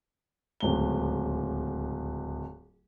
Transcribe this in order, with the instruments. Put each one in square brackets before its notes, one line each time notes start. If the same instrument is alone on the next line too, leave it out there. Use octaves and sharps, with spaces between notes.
[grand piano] D1 C#2 G7